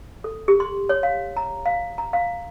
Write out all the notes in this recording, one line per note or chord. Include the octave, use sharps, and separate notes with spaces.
A4
G4
C6
C#5
F5
A#5
F5
A#5
F5